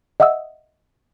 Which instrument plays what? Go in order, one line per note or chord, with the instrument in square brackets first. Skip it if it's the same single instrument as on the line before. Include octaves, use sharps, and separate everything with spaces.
[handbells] D#5 E5 F#5 D#6 E6